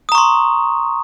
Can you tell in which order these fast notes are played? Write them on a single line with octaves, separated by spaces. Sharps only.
D#6 A#5 C#6 C6